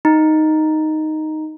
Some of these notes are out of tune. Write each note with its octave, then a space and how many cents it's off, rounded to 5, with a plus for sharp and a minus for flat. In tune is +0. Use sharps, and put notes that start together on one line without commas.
D#4 +0